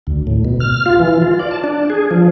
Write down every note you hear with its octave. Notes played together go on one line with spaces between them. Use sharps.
D2
A2
B2
F6
F4
E3
F4
D5
A5
D4
G#4
F3